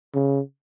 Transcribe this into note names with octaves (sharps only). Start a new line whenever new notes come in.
C#3